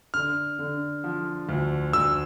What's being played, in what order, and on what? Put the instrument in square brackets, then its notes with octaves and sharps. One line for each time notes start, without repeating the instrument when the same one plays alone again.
[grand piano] D3 [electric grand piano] F6
[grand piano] D3
F3
D2
[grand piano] D2 [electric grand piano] E6